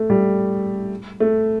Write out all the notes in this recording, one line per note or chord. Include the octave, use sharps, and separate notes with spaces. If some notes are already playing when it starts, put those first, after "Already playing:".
Already playing: A3
G3
A3